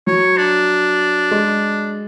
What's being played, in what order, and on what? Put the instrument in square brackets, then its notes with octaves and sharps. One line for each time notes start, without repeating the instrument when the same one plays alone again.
[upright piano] F#3 [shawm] C#5
[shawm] D4
[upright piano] G#3